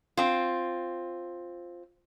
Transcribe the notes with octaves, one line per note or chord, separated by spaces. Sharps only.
C4 F4